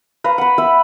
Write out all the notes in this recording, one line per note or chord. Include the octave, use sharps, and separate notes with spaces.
B4 F5 A#5
F#5 B5
B4 E5 B5